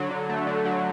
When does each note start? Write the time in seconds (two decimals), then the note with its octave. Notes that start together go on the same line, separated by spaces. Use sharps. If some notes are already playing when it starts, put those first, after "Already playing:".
Already playing: D3 F#3
0.11 D3
0.29 A3
0.47 D3
0.65 F#3